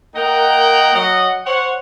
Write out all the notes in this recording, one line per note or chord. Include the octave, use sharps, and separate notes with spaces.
A#3 D#4 A#4 D#5 F#5 G5
F#3 D#5 F#5
C5 C#5 F#5